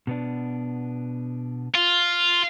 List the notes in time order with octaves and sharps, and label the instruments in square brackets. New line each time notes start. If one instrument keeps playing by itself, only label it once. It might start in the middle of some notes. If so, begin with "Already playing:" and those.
[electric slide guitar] B2 B3 D4
[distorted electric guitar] F4